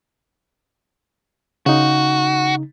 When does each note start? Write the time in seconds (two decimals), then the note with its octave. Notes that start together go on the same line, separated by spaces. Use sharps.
1.66 C#3 D#4 F#4